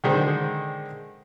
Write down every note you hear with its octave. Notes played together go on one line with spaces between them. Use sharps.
D3 D#3 G#3 C5